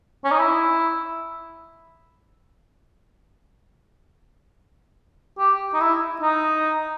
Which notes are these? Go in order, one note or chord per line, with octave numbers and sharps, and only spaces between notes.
C#4
D#4
E4
G4
D#4
E4
D#4